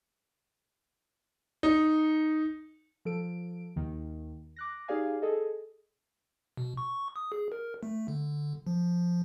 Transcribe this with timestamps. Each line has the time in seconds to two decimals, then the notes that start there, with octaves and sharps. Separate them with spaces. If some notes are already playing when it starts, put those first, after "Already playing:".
1.63 D#4
3.05 F3 A4 D7
3.76 D#2 D#3
4.56 D6 F#6 A#6
4.88 D#4 G4 G#4 D5 F5 G#5
5.22 G#4 A4 D#5
6.57 B2
6.77 C#6
7.16 D#6
7.32 G#4
7.52 A#4
7.83 A3
8.08 D3
8.67 F3